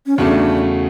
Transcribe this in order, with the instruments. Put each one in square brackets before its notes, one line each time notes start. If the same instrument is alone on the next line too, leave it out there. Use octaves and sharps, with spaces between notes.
[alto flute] C#4
[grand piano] E2 C#3 F#3 A3 [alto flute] D4